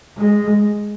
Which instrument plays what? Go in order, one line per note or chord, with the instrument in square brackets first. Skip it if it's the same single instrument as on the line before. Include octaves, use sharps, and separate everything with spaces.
[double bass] G#3